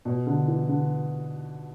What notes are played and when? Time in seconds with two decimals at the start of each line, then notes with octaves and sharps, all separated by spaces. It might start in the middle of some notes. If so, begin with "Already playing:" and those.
0.05 B2
0.27 D3
0.48 E3
0.69 D3